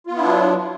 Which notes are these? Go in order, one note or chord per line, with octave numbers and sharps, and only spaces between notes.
F#3 B3 D4 E4 F4